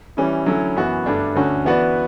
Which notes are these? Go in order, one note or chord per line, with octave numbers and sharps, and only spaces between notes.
E3 G3 C#4 E4
D3 F#3 A3 C#4 E4
F#2 E3 B3 F#4
G2 D3 A3 D4
D2 D3 A3 C#4 F#4
E3 B3 F#4 B4 D5